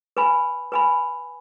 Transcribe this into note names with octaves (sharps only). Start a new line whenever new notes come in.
B4 G#5 B5
B4 G#5 B5